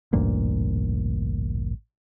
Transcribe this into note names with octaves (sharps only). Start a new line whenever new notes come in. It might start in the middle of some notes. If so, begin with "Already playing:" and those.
A1 D2 G2 A#2